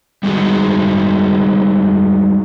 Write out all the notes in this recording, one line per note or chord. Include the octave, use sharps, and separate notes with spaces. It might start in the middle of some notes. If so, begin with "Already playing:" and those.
G3 G#3 D#4 F#4 G#4